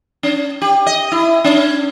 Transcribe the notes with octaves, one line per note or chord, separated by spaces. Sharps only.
C#4
G4
D#5
E4
C#4